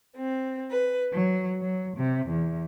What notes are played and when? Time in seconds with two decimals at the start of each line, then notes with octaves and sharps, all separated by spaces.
0.15 C4
0.71 B4
1.14 F#3
1.62 F#3
1.97 C3
2.28 E2